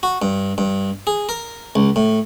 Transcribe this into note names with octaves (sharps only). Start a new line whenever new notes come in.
F#4
G2
G2
G#4
A#4
C#2
A2